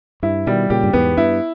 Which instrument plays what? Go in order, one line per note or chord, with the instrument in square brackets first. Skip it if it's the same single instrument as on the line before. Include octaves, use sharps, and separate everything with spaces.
[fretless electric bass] G2 [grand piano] E4
[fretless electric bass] B2 D#3 [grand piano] G3
[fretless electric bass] A#2 C#3 [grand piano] G4
[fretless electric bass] G2
[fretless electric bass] E2 G#2 [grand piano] B3
[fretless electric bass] G2 [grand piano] E4